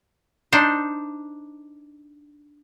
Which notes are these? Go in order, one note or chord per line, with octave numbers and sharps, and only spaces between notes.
D4 D#4 C5